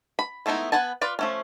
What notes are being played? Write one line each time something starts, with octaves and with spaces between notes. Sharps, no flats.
B5
G#3 A3 B3 D#4 E4
B3 B4 F#5 G#5 A5
F4 B4 D5
F3 A3 C#4